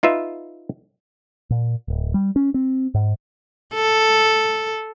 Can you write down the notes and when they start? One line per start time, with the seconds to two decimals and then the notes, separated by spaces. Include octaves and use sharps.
0.03 D#4 F4 B4 E5
1.50 A#2
1.88 D1
2.14 G3
2.36 C#4
2.54 C4
2.94 G#2
3.74 A4